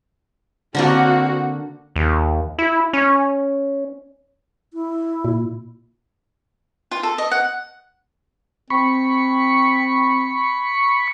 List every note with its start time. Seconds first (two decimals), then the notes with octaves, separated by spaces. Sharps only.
0.75 D3 A#3 C4 D4 F#4
1.96 D#2
2.59 E4
2.93 C#4
4.74 E4
5.25 A#2
6.91 F4
7.03 A4
7.18 D#5
7.31 F#5
8.70 C4 B5 C#6